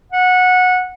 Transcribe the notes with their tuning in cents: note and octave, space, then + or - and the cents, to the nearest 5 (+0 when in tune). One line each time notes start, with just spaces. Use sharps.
F#5 -15